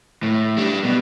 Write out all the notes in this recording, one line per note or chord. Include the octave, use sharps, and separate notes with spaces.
A2
G3 D4
B2